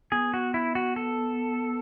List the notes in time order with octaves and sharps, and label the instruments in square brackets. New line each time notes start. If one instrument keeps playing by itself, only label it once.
[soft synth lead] B3 [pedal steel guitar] G#4
[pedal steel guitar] F#4
E4
F#4
A4